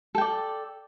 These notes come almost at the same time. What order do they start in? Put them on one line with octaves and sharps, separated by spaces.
A4 G5 D5